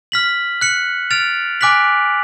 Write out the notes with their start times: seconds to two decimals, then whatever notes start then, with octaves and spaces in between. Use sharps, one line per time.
0.12 F6 B6 F#7
0.61 F#6 C#7 F#7
1.11 F6 A6 D7 F7
1.61 G#5 D6 F#6 B6 F#7